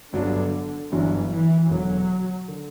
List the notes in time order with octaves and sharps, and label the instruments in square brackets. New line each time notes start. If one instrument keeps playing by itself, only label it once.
[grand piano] G1 G2 F#3 B3 D4 [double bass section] D3
[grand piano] G1 G2 F#3 B3 D4 [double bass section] E3
[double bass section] E3
[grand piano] E1 E2 D3 [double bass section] F#3
[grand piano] D3